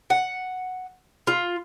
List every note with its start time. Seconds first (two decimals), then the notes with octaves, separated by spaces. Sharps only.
0.10 F#5
1.27 F4